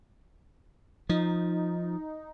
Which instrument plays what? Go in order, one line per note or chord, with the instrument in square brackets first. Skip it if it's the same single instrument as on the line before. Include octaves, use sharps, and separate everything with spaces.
[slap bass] F3 [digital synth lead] D#4